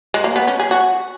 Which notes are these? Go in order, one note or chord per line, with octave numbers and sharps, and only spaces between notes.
G#3
A#3
B3
C#4
G#4
F#4